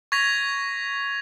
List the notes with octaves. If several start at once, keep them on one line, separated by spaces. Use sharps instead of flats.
C#6 G#6 A#6 B6 F7